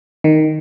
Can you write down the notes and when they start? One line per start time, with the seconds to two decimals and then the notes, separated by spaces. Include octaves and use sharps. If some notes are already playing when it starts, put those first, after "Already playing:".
0.24 D#3